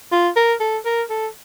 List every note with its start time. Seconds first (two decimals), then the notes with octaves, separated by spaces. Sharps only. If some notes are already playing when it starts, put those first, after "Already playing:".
0.12 F4
0.36 A#4
0.60 A4
0.85 A#4
1.10 A4